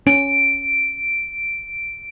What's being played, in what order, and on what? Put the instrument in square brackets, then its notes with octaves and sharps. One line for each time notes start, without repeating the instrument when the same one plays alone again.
[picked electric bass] C#4 [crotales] D7